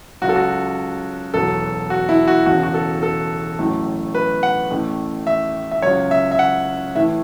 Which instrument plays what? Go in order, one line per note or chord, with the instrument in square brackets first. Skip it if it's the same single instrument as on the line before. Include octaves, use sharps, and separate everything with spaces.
[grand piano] C#2 C#3 F#3 F#4
A4
F#4
E1 E2 B2 F#3 A4
F#4
E4
F#4
E1 E2 C#3 F#4
F#4
A4
A4
A1 A2 F#3 A3
B4
F#5
A1 A2 A3
E5
E5
C#2 C#3 F#3 C#5
E5
E5
F#5
A2 E3 A3 E5